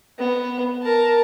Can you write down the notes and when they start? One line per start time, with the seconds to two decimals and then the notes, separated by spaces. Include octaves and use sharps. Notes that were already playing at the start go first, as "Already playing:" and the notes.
0.18 B3
0.83 A#4 A5